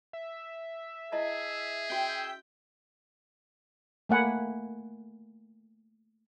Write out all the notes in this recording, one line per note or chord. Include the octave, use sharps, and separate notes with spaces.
E5
E4 G#4 D#5 A5
C#4 F#4 G5
A3 A#3 F#5 G#5 B5